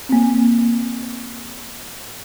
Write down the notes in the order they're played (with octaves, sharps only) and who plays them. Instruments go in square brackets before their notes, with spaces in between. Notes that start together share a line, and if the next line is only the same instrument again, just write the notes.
[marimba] A#3 C4